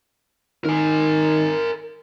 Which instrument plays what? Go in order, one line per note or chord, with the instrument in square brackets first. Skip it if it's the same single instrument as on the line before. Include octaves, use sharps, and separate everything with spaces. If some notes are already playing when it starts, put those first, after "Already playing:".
[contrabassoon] D#3 [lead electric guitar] A#4 G#5